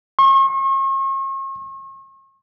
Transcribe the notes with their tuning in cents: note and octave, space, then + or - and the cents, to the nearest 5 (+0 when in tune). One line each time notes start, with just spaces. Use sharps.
C#6 -45